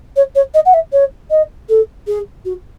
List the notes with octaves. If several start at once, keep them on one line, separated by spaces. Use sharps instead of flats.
C#5
C#5
D#5
F#5
E5
C#5
D#5
A4
G#4
F#4